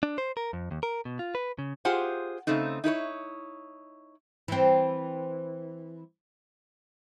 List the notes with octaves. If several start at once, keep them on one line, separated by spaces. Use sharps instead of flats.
D4
C5
A#4
F2
D#2
A#4
B2
F4
B4
C#3
F4 G4 G#4 C5 F#5
C#3 A3 C4 D#4
D#4 E4 A#4 C#5
E3 C4